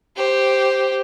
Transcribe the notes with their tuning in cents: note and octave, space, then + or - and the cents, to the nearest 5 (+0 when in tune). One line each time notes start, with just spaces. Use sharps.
G4 +0 C5 +0